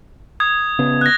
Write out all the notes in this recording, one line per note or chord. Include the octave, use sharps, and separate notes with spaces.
D#6 G#6
C#3 B3
F#6 A#6